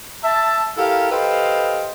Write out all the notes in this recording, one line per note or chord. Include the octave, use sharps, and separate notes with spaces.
E5 A5
E4 G4 A4 A#4 F5
G4 A4 B4 C5 D#5 F5